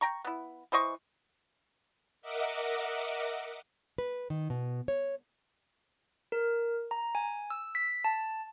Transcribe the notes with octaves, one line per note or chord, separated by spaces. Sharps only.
G5 A#5 C#6
B3 E4
E3 C5 D#5 C#6
A#4 D#5 E5 F#5 D6
B4
D#3
B2
C#5
A#4
A#5
G#5
E6
B6
A5